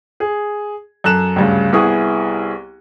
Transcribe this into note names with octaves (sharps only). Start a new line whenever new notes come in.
G#4
F#2 A4 F#6 E7
D2 G2 C#3
C2 B3 E4 G#4 C#6 D#6